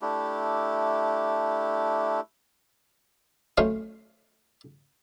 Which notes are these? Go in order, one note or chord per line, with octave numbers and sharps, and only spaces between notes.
A3 D4 E4 G4
F#3 A3 C#4 C5 C#5 F5